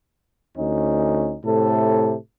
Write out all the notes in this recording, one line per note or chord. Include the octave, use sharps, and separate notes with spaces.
D2 C#4 D#4
A2 C3 A4